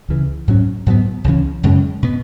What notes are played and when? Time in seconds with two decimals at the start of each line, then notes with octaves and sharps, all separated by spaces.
0.09 C#2 C#3 E3
0.48 G#2 F#3 C#4
0.86 G#2 F#3 B3
1.24 C#2 C#3 E3 C#4
1.63 F#2 C#3 G#3 C#4
2.03 B2 B3